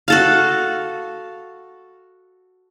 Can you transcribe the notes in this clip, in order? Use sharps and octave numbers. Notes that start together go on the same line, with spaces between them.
F#4 A4 F5